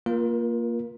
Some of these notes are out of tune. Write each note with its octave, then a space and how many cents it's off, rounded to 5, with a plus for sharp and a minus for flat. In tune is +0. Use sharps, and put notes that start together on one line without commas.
A#3 +0 F4 +0 A#4 +35